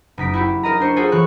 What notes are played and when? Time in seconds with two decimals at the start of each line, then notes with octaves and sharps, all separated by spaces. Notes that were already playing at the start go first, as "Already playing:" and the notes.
0.18 F#1 D#4 B6 D7
0.34 E4 F#4 G4
0.63 D#4 A#4 D#5 A#5
0.80 D4 C5 C#6 C#7
0.96 D#4 F4 F#4 G#4 A4 C5
1.12 E3 F#4 C#5 C#6 F#6